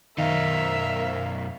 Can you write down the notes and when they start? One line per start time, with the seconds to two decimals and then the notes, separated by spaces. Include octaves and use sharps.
0.18 F#2 B2 D#3 D#4 A#4 E5 F5